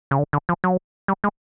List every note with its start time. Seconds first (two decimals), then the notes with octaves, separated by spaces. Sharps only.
0.11 C#3
0.19 D3
0.33 D3
0.49 F3
0.64 F#3
1.08 G3
1.24 G#3